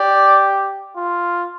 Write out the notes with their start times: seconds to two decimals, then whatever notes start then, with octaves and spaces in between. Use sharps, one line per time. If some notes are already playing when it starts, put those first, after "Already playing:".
Already playing: G4 D5
0.96 F4